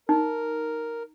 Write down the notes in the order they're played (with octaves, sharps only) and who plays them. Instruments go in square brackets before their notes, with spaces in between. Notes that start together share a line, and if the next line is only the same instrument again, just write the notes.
[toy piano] D#4 [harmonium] A#4